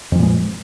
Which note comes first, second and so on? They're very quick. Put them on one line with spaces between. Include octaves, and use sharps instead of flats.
F2 F3 A#2 G#3